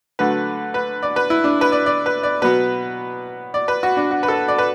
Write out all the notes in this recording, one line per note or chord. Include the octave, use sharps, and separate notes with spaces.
D3 F#3 A3 B4
B4
D5
B4
E4
D4
B4
D5
D5
B4
D5
B2 F#3 B3 B4
D5
B4
F#4
D4
F#4
B4
A4
D5
B4